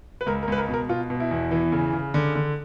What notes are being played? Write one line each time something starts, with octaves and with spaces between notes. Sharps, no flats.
B4
C#2 A#4
A#4
C#2 B4
A#4
B2
A#4
B2 F4
B2
E4
E2
E3
C#3
C#3
D3
D3